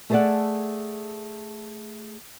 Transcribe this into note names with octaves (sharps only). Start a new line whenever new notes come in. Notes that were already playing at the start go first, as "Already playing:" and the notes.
A3 G#4 A4 C5 D5 F#5